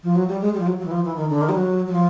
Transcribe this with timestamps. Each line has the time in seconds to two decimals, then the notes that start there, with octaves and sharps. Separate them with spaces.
0.03 F3
0.16 F#3
0.28 G3
0.41 G#3
0.54 G3
0.60 F3
0.67 F#3
0.78 F#3
0.85 E3
0.91 F3
1.04 E3
1.16 D#3
1.30 D3
1.41 D#3
1.49 G3
1.55 F#3
1.87 F#3
1.92 F3